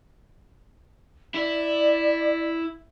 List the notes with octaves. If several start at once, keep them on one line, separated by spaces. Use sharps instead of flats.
E4 D5